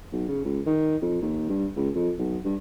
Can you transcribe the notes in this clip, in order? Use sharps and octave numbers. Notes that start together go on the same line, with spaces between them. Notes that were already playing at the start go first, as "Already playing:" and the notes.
B1
C#3
C#2
D#3
F2
D#2
G2
C#2
F2
B1
G2